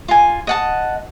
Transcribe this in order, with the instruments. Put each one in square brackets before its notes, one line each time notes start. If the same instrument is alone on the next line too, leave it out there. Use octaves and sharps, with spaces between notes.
[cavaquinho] F4 G#5
D#5 F#5 A5